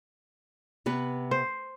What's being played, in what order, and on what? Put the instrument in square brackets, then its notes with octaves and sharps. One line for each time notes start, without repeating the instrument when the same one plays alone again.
[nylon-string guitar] C3 B3 B4
[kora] C5